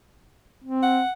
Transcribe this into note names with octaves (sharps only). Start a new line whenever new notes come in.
C4
F#5